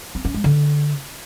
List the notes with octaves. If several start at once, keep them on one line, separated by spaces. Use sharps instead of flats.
C4
C#4
G#3
D3